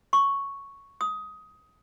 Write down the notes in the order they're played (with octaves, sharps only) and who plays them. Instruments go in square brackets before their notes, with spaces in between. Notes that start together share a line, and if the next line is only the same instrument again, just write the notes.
[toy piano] C#6
D#6